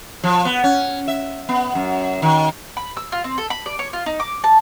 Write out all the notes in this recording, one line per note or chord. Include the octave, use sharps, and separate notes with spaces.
F3
B3
C#4
E5
B3
F#2
D#3
B5
E6
F4
C4
A4
B5
D5
C#5
F4
D#4
D6
A5